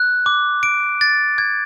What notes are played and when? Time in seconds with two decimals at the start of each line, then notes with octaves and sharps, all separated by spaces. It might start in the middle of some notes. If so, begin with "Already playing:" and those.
Already playing: F#6
0.26 D6
0.63 D7
1.01 A6
1.38 G#6